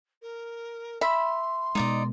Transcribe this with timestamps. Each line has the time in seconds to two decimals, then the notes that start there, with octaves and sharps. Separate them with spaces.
0.21 A#4
1.01 E5 B5 C6
1.75 B2 G#3 D#4 D5 D#5